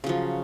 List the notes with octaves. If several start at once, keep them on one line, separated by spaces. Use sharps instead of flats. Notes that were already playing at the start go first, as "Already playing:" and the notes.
C#3 F3 F#3